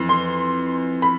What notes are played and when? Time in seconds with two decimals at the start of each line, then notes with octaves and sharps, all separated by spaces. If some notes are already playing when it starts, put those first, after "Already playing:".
Already playing: F2 E3
0.09 C6
1.02 B5